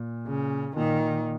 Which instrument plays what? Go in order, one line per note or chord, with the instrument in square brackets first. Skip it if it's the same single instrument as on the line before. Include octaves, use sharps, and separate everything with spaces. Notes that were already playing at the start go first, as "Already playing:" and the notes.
Already playing: [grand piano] A#2
[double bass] C#3
[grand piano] A#2 [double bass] D#3